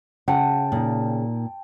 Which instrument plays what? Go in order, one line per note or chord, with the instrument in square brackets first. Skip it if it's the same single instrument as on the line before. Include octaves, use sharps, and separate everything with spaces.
[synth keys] C#3 [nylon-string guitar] F#5 [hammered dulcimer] G5 A5
[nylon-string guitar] A#2 D#4